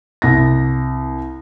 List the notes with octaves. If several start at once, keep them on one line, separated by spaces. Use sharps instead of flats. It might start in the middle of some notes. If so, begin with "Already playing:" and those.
C2 A#6